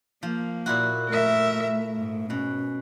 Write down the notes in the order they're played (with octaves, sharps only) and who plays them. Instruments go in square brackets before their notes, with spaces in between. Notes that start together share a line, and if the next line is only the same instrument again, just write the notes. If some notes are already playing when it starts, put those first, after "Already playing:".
[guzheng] F3 [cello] A#3
[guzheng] A#2 E4 F#4
[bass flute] A3 [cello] A#4 E5
[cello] G#2
[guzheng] B2 [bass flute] C#4